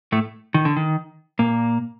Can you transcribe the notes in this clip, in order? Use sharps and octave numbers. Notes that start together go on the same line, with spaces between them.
A2 A3
D#3
D3
D#3
A#2 A#3